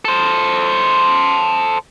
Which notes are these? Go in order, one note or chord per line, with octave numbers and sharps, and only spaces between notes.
A4 C5